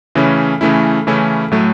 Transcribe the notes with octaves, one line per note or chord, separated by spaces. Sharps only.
C#3 E3 A3 C#4 E4
C#3 E3 A3 C#4 E4
C#3 E3 A3 C#4 E4
A2 F#3 A3